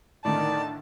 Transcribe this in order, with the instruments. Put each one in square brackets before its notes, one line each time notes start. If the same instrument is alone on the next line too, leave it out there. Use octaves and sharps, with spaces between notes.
[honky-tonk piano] A2 D3 [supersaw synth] D#3 [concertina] D5 [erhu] A5